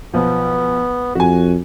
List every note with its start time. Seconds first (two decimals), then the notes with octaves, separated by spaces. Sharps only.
0.14 B1 F3 B3
1.15 F2 F#4 G#5